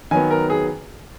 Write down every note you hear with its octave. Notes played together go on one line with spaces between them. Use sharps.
D#3 F#3 B3 G#5
A#4
G#4